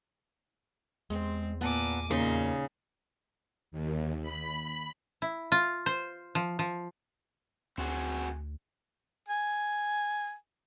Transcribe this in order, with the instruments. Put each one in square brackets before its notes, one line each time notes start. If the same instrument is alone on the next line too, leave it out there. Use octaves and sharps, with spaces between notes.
[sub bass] E2 [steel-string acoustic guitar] G#3 [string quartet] C4
[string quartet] A#2 G#5 D6 [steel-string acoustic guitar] B3 F#5 A5
[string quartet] D#2 A#2 [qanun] C#3 D#4 C6 [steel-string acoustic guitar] A#3
[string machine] D#2
B5
[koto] E4
F4
C5
F3
F3
[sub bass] D2 [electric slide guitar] C4 F#4 G#4
[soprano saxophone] G#5